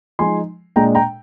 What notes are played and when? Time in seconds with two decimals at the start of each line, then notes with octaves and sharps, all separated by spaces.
0.19 F3 G#3 D#4 G#5 C6
0.76 A#2 G#3 D4 G5 A#5
0.95 G5 A#5